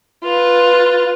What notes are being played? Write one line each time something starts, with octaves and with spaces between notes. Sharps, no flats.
F4 B4